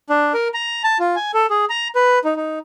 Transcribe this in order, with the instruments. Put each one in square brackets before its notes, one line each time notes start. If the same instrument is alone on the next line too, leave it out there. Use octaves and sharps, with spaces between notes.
[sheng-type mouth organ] D4
A#4
A#5
A5
F4
G#5
A4
G#4
A#5
B4
D#4
D#4